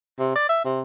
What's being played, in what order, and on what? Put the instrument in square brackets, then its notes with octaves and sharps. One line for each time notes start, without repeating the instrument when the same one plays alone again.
[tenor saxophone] C3
D5
E5
C3